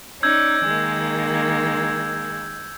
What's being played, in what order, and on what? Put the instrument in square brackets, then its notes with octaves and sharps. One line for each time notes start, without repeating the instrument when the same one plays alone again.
[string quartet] C#4 D#4 D5 [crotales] E6 G6 G#6
[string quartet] D#3 G#3 A#3